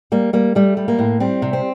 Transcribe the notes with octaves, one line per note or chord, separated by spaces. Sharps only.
G3 A#3
G3 A#3
G3 A3
G3
A#3
A2
G3 C4
C3
C4